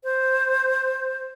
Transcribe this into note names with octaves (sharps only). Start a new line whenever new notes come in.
C5